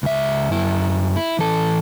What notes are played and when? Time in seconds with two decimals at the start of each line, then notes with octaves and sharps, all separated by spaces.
0.03 C#2 E5
0.51 F#2 E4
1.16 E4
1.39 E3 A4